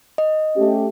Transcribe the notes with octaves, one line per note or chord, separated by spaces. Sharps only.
D#5
A3 C#4 G4